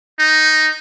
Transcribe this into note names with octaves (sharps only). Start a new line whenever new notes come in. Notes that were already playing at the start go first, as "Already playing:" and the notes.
D#4